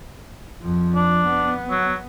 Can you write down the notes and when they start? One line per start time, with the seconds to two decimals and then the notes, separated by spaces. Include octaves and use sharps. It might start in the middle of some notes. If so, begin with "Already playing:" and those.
0.62 F2 F3
0.95 D4
1.27 B3
1.70 F#3